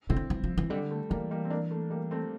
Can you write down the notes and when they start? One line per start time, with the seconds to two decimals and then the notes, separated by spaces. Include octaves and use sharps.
0.10 C3 C4 E4
0.16 D3
0.30 E3
0.44 F3
0.58 E3
0.70 D3 G3
0.91 A3
1.10 E3 G3 A#3
1.31 G3 A#3
1.45 C4
1.50 A#3 D4
1.71 A3
1.90 G3 A#3
2.11 A3 C4